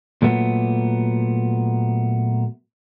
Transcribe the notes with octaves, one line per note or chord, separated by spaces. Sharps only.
A#2 F#3 A3 B3